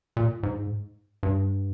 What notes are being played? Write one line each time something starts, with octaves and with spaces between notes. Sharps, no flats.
A#2
G#2
G2